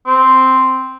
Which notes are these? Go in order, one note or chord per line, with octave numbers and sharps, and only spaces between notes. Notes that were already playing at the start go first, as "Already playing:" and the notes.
C4